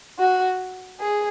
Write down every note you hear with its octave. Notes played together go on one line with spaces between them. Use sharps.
F#4
G#4